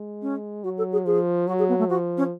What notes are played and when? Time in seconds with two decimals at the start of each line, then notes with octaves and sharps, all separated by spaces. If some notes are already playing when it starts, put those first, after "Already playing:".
Already playing: G#3
0.22 C#4
0.64 F#3 F#4
0.77 A4
0.92 G#4
1.05 F3 G#4
1.47 F#3 F#4
1.58 G#4
1.68 B3
1.78 A3
1.89 F3 F#4
2.17 C#4